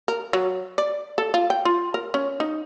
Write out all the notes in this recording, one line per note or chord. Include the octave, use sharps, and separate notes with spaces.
A#4
F#3
D5
A4
F4
G5
F4
A#4
C#4
D#4